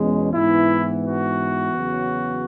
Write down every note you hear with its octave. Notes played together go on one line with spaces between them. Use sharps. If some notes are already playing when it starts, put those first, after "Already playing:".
Already playing: E2 B2 G#3 C#4
G#2 E3 B3 E4
F#4
E2 C#3 F#3 B3